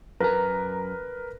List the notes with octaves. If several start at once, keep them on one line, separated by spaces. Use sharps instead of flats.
F#2 A#4 B4 A#5